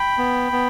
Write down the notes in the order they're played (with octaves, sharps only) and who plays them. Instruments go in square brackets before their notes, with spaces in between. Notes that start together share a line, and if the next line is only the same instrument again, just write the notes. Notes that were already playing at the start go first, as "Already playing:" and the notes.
Already playing: [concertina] G5 B5
B3
B3